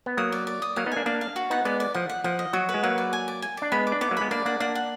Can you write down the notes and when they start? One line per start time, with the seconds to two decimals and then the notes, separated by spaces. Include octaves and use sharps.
0.06 B3
0.17 F#3 A#3 D#6
0.32 D5
0.47 D5
0.62 D#6
0.76 F#3 A#3 F5
0.86 B3 D#4
0.92 A#3 D4 G#5
1.06 A#3 D4 F5
1.21 F5
1.36 F#4
1.50 B3 D#4 F#5
1.65 G#3 B3 D5
1.80 D5
1.94 F3 F#5
2.10 F#5
2.24 F3 F#5
2.39 D#5
2.53 F#3 F#4
2.69 B4
2.74 G#3
2.83 F#3 A#3 F#4
2.98 D5
3.13 G#5
3.28 D5
3.42 G#5
3.57 D4 D5
3.72 G#3 B3 B5
3.87 D6
3.92 D4
4.01 B3 D#4 D6
4.11 F#3 A#3
4.17 G#3 B3 B5
4.31 A#3 D4 D5
4.46 A#3 D4 F#5
4.60 A#3 D4 F#5
4.75 F#5